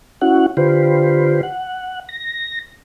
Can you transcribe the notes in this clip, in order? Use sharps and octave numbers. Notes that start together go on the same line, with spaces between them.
C#4 E4 F#4 F#5
D3 F4 G4 B4 C5
F#5
A#6